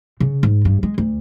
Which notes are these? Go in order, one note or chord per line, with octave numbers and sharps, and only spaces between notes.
C#3
G#2
G2
G#3
D2